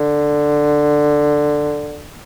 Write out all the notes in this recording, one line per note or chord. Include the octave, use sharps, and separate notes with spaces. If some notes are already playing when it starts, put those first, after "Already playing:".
Already playing: D3